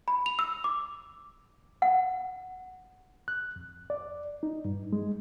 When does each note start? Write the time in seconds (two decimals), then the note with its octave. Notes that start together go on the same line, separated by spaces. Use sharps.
0.08 B5
0.26 F7
0.39 E6
0.64 D6
1.82 F#5
3.28 F#6
3.56 F2
3.90 D5
4.43 D#4
4.65 G2
4.93 G#3